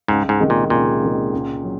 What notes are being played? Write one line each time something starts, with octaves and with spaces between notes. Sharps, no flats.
C#2 G#2
G#2
C3 D#3 G#3
A#2
C#2 A#2
C3 D#3 G#3
C#2
F#3 C#4